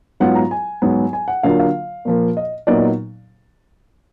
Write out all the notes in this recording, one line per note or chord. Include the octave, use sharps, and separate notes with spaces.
G#2 F#3 B3 F4 F#5
A#5
G#5
G#2 F#3 B3
G#5
F#5
D3 F#3 A#3 F4 F5
F5
A#2 F3 A#3
D#5
A#2 F#3 B3 D#4 D5